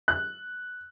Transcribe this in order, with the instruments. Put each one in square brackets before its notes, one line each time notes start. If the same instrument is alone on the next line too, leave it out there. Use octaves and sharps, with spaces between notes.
[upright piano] F#6